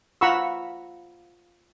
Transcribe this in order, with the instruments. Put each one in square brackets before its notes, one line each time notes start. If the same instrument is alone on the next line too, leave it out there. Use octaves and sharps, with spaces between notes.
[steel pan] F4 F#5 A#5 B5 C#6 E6